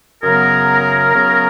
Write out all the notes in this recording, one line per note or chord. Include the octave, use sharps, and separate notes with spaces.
F#2 C#3 F#3 B3 G#4 A#4
F#2 C#3 F#3 B3